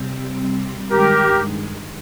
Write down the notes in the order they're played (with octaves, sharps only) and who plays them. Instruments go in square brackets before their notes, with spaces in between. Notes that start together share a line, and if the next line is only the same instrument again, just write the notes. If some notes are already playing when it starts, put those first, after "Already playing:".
Already playing: [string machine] C3 G3 C4
[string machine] G2 D#3 G#3 [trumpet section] G4 A#4